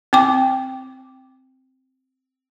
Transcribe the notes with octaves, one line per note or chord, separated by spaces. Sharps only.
C4 G5 D6